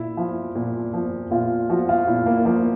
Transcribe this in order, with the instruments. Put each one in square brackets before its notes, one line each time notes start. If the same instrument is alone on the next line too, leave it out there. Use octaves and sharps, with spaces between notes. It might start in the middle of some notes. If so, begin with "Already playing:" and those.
Already playing: [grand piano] A#2 E4
F3
A#2
F3
A#2 F4
F3 F#4
F4
A#2 E4
A#3
F3 A#3